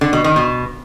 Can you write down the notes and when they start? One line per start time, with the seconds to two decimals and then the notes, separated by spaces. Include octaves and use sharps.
0.01 D3
0.13 B2
0.24 D#3
0.36 B2